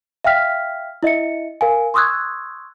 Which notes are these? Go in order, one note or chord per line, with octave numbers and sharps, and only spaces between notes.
E5 F5 G5 F6 B6
E4 D#5 E5 C#7
A#4 F5 G#5
C6 C#6 D#6 E6 F#6 G#6